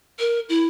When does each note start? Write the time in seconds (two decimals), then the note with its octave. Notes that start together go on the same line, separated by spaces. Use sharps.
0.19 A#4
0.49 E4